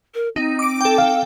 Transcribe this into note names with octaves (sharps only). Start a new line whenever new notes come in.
A#4
C4 D#4
D6 D7
A4 G5
F5